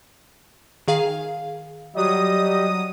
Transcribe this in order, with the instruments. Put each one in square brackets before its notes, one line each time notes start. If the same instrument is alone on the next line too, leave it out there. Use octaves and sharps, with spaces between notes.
[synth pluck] D#3 G#4 F5
[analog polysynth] F#3 D#6 [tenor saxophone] G3 [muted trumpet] D#5